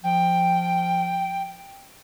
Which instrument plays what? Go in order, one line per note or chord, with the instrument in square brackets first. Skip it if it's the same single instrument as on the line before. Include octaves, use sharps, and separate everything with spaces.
[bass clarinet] F3 [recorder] G5